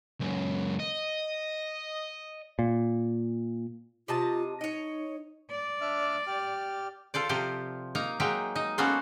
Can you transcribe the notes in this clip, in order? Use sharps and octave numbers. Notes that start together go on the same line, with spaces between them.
C#2 F#2
D#5
A#2
C3 F4 D#5 A5
D#4 C#5 D#5
D5
D4 E5 F6
G4 F6
F4 A4 C5 D5
C3 F3 G4 C5
A#3 D#4 A#5
F#3 G#3 A#3 D#4 E5 G5
D#4 D#5
A#3 B3 C#4 F#4 A4 C5